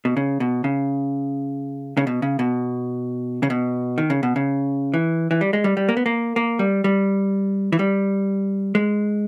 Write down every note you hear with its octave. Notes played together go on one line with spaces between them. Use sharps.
B2
C#3
B2
C#3
C#3
B2
C#3
B2
C#3
B2
D#3
C#3
B2
C#3
E3
E3
G3
G#3
G3
G3
A#3
B3
A#3
A#3
G3
G3
E3
G3
G#3